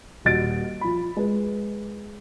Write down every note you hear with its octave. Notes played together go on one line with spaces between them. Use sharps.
D#1 F#4 D#5 A6 D7
F3 B5
G#3 B4